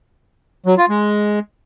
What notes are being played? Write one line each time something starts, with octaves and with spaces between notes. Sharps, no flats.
F#3
F4
G#3